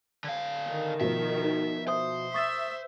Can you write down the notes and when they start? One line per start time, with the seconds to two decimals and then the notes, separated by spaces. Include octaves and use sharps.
0.24 D3 F5
0.69 D#3
1.01 B2 F3 E5
1.44 D#4
1.88 C5 E5 D#6
2.34 E5 C#6 D#6 A6